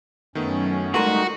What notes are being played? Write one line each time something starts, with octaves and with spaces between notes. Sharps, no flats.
F#2 D#3 A3 B3 C#4
G#2 G3 A3 D#4 F#4 A#4 C6 D#7